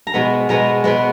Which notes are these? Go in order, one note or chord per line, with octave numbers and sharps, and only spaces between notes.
A#5
B2 G#3 B3 B5
B2 G#3 B3 A#5
B2 G#3 B3 B5